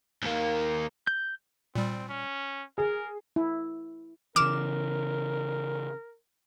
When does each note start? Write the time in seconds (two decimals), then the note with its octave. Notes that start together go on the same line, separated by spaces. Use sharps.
0.22 D#2 A#3
1.07 G6
1.75 A#2 G3 C4
2.09 C#4
2.78 G#4 A#4
3.36 E4
4.36 C#3 E3 A#4 D6 F6 E7